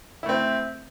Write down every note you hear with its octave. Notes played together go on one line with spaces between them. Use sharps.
A3 C4 E4